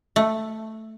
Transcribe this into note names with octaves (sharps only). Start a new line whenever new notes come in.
A3